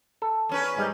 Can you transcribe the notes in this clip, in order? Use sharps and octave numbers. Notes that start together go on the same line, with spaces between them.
A4
E2 C#4 B4
G#2 G3 G#3